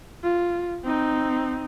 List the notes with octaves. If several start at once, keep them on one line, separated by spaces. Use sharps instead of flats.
F4
C4 D#4